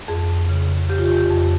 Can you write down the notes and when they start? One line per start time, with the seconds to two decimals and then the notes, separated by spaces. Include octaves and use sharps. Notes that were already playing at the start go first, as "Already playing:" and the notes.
0.08 F2 G#4
0.49 C#3
0.90 C#3 G4
0.98 F4
1.06 G4
1.17 G4
1.30 F2